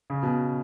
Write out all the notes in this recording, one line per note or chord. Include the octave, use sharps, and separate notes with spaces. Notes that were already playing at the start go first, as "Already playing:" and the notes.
C#3
B2